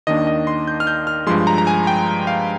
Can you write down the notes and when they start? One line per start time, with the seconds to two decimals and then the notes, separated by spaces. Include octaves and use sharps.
0.07 D#2 D#3 A#3 D4 D#5
0.27 D#5
0.47 C6
0.68 G6
0.80 F6
0.87 G6
1.07 F6
1.27 G2 F3 G#3 C6
1.47 A#5
1.58 A#5
1.67 G#5
1.87 G5
2.27 F5